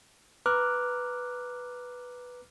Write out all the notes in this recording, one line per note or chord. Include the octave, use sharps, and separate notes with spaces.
B4 A#5 D6 F6 F#6